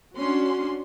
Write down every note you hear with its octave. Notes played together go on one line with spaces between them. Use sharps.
C#4 D4 F#4 C6